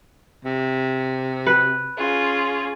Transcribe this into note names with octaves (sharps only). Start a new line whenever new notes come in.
C3
B4
C#4 F4 G#4